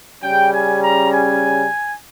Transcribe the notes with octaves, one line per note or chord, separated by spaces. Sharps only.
C#3 G3 C#4 G5
G#5
A#5
G#5